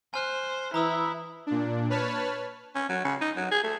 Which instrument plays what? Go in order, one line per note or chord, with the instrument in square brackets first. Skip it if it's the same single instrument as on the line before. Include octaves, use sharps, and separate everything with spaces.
[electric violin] C5 [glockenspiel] G#5 F6 F#6
[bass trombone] E3 [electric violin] E4 [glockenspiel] A#5 D#6 E6
[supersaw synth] A#2 D4
B4 C#5 A5 B5 F6
[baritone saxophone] C#4
F#3
C#3
D#4
F#3
G#4
A3